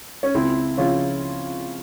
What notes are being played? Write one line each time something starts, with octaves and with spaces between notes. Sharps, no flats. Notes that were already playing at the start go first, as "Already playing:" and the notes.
C#4
C#2 C4 E4
C#3 F3 C#4 F4